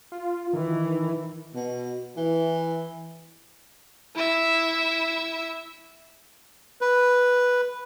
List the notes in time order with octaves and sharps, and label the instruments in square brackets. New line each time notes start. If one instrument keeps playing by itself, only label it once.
[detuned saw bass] F4
[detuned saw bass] D#3 [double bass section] E3
[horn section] B2
E3
[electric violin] E4 E5
[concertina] B4